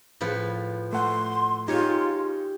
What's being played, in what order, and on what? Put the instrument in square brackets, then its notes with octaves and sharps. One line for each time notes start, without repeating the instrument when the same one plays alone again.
[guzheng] A2 F3 B4
[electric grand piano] A3 F#5 [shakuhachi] C6
[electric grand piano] D#4 [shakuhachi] F4 [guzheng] G4 C#5 G#5